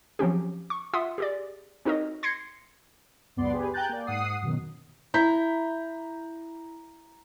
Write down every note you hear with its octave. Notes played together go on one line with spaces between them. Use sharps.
F3 F#3 C4 C#4 G4
C#6
F4 E5 F#5 C6 D#6
G4 G#4 D5
C4 D#4 F#4 A#4 C#5 D#5
C6 G#6 A#6 C7 C#7
C#2 F#2 B3 D4 D5 C6
G4 G#4 B4
G5 G#5 A#5 F#6 G6 A6
A#3 D5
G#2 F#5 D#6 C7
F#2 B2 D#3
E4 A#5 G6 B6